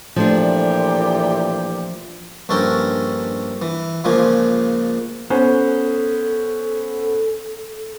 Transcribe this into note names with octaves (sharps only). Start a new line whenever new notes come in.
A#2 E3 F3 A3 D4 G4
A#1 G2 C#4 A4 A#4 G5
E3
C#2 A#2 C#3 F3 A#3 G#5
B3 C#4 A4 C5